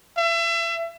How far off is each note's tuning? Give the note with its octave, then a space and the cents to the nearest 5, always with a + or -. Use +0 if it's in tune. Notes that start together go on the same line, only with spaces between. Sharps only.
E5 +35